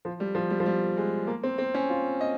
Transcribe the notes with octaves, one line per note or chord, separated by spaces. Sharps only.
F3
G3
F3
G3
F3
G3
G#3
A#3
C4
C4
C#4
F4
D#5